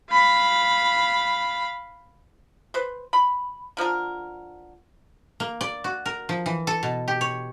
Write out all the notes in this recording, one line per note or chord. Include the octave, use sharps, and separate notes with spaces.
F5 B5
B4 C5
B5
D3 F3 A#3 A#4
A#3
D5
F#4
A#4
F3
E3
A4
B2
G4
C#5